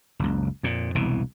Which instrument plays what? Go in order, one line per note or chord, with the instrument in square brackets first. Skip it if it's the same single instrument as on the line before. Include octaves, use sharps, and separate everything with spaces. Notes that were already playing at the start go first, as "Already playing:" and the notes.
[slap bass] F#1 C#2
F2 A#2
E1 C2 B2 E3